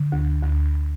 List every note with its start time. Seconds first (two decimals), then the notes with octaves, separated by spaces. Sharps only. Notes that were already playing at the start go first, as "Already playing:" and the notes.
Already playing: D3
0.12 D2
0.43 D2